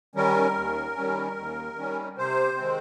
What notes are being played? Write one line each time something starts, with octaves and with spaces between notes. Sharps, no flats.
D#3 G3 C#4 A#4
D#2
D#3 G3 C#4
D#2
D#3 G3 C#4
C3 C5
D#3 G#3 C4